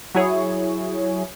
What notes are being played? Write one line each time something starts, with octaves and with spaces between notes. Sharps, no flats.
F#3 E4 G#4 C#5